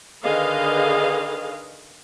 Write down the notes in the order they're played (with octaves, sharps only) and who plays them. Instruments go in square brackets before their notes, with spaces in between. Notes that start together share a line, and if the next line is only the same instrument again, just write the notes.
[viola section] D3 D#3 G#4 B4 D#5 F5